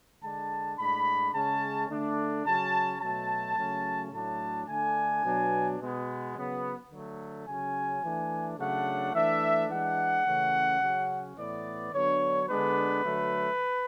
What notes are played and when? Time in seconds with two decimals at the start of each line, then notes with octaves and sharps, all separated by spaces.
0.21 D3 G#3 D4 A5
0.77 A2 G#3 D4 B5
1.33 C#3 G#3 C#4 A5
1.90 D3 A3 D4
2.45 C#3 F#3 C#4 A5
3.01 B2 F#3 A3 A5
3.57 C#3 F#3 A3 C#4
4.12 A2 F#3 A3 D4 A5
4.68 D3 A3 D4 G#5
5.24 B2 F#3 B3 D4
5.80 B2 G#3 B3
6.35 C#3 F#3 B3
6.91 D3 F#3 A3
7.46 C#3 F#3 C#4 G#5
8.02 E3 A3 D4
8.58 C#3 F#3 A3 D4 F#5
9.13 E3 A3 D4 E5
9.70 E3 G#3 D4 F#5
10.25 C#3 E3 A3 C#4
10.81 C#3 F#3 C#4
11.37 A2 E3 B3 D5
11.92 D3 F#3 B3 D4 C#5
12.49 D3 G#3 B3 D4 B4
13.04 D3 F#3 A3